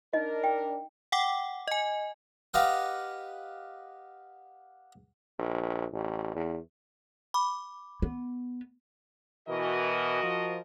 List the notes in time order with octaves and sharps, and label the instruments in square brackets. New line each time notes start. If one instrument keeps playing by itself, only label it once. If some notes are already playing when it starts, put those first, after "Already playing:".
[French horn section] D4 A#4 [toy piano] D#4 D#5
[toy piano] G5
[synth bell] F#5 G5 D6
D#5 G#5
[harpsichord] G4 B4 D#5 F5 F#5
[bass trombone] A#1
A1
E2
[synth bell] B5 D6
[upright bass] B3
[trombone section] B2 E3 [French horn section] F#4 A#4 D#5
[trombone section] F3